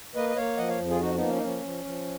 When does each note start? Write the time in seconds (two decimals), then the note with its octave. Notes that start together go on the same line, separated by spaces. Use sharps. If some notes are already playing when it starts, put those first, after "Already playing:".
0.15 A#3 B4 D#5
0.29 D#5
0.36 A#3 C#5 F5
0.58 F3 D#5 F#5
0.68 C#5 F5
0.79 F2
0.89 F4 G#4
1.00 F3 D#4 F#4
1.14 B3 D#4
1.21 A#3
1.29 C#4
1.36 D#4
1.43 F3 C#4
1.63 F3
1.85 F3